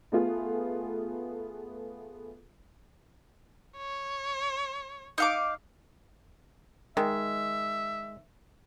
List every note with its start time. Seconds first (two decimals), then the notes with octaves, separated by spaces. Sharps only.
0.12 A3 B3 F4 G#4
3.77 C#5
5.18 D#4 F5 D6
6.97 D#3 G#3 E5